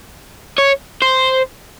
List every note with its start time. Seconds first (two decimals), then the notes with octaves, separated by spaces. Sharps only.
0.58 C#5
1.02 C5